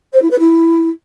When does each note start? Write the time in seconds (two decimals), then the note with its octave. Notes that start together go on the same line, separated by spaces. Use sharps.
0.13 C5
0.21 E4
0.30 B4
0.39 E4